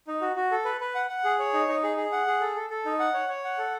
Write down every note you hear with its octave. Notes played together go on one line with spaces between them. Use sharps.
D#4
F#4
F#4
A4
B4
B4
F#5
F#5
G#4
C#5
D#4
D#4
G#4
G#4
F#5
G#4
A4
A4
A4
D#4
F#5
C#5
C#5
F#5
A4